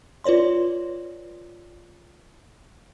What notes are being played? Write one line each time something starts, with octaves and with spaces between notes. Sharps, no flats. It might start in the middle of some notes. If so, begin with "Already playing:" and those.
F4 B4 C#5 D5 C6